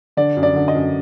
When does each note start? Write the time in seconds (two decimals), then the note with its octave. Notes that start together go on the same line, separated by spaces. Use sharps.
0.17 D3 D5
0.37 F#2
0.43 D5
0.55 D3
0.68 D#5
0.75 F#2